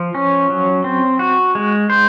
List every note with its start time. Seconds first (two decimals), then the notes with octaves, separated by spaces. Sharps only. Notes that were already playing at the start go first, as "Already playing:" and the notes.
Already playing: F3
0.15 C#4
0.50 F#3
0.84 C4
1.19 F#4
1.55 G#3
1.90 C5